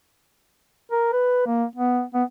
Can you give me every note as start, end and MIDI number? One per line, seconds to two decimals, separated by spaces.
0.92 1.09 70
1.13 1.46 71
1.47 1.65 58
1.76 2.03 59
2.14 2.24 59